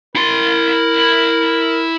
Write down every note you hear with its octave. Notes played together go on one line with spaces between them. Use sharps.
E4 A#4 C6